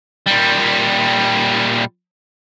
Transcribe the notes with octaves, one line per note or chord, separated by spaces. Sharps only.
A#2 G3